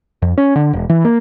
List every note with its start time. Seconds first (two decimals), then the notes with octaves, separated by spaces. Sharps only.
0.22 F2
0.38 C#4
0.56 D3
0.73 E1
0.89 E3
1.05 A#3